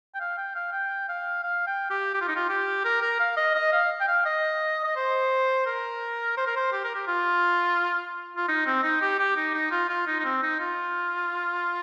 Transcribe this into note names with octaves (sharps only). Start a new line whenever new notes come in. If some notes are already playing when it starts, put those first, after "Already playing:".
G5
F5
G5
F5
G5
F5
F5
G5
G4
G4
F4
D#4
F4
G4
A#4
A#4
F5
D#5
D#5
F5
G5
F5
D#5
D#5
C5
A#4
C5
A#4
C5
G4
A#4
G4
F4
F4
D#4
C4
D#4
G4
G4
D#4
D#4
F4
F4
D#4
D#4
C4
D#4
F4